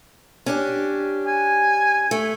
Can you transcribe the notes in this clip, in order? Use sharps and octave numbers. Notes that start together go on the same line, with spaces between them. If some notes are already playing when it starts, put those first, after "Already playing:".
C#4 D4 G4
G#5
A3